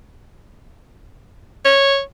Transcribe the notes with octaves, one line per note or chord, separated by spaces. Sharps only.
C#5